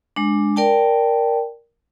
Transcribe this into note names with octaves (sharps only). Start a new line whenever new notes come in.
G#3 D4
A#4 D5 G5 A5